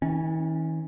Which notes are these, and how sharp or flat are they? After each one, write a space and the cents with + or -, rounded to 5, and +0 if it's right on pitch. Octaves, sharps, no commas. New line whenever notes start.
E3 -45 C#4 -15